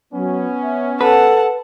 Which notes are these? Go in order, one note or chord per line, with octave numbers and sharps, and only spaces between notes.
F#3 B3 C#4
E5
A4 B4 F#5 A5